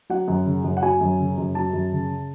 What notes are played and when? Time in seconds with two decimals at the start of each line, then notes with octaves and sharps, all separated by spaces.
0.10 F#3 F#5
0.28 F#2
0.46 C#3
0.64 F#2
0.77 F#5
0.82 F#3 G#5
1.01 F#2
1.20 C#3
1.38 F#2
1.55 F#3 A5
1.73 F#2
1.92 C#3